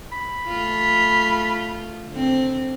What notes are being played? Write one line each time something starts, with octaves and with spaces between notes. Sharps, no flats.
B5
A3 F4
D3 C4